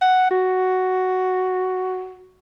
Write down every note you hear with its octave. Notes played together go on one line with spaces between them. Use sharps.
F#5
F#4